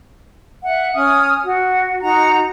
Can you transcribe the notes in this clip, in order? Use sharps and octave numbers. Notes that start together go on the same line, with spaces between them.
E5 F#5
C#4 D#6 F6
F#4
D#4 F#4 A#5